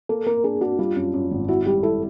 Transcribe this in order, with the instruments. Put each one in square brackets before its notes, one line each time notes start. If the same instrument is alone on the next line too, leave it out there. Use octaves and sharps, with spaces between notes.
[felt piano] A#3 [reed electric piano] A4
[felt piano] A#3 [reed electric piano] A#4
[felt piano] D4 [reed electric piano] G#4
[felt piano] D4 [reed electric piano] F#4
[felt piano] G3 [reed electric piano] F4
[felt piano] F#2
F#2
G#1
[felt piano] E4 [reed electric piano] F#4
[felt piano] G3 [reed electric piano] G4
[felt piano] E4 [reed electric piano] A4